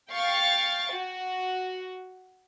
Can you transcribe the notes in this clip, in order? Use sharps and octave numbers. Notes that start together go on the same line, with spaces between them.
F5 G5 C#6 A6
F#4